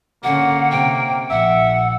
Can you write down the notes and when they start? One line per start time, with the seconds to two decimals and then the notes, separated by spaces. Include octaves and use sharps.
0.24 D3 A#3 C#4 F#5
0.71 C3 G5
1.30 A#1 E5 F#5